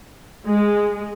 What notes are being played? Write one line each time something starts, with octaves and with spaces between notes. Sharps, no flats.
G#3